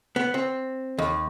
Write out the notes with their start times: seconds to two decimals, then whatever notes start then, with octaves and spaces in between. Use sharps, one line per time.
0.16 B3
0.34 C4
0.98 D#2